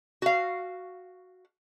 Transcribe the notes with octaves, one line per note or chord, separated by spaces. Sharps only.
F#4 F5